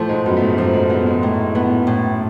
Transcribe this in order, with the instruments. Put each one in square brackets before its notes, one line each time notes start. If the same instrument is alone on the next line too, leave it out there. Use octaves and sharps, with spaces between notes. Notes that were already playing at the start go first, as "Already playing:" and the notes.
Already playing: [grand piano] A2 A3 [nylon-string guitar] F3
[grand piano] G#2 G#3
[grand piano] F#2 F#3 [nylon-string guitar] B3
[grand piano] A3
G#2 G#3
[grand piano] F#2 F#3 [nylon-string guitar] F3
[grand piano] G#2 G#3
[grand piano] G#2 G#3 [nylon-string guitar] B3
[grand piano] G#2 G#3
[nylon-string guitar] A2
B3
A2